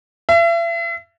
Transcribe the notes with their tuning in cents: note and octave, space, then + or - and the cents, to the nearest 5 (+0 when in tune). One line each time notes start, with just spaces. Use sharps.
E5 +40